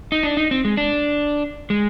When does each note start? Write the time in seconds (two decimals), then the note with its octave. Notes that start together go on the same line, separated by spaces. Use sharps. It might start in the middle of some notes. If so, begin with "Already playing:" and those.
0.12 D#4
0.23 D4
0.37 D#4
0.51 C4
0.65 G#3
0.77 D4
1.70 G#3